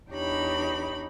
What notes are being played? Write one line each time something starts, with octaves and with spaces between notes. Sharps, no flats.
E2 D4 D#4 G4 C#5 B5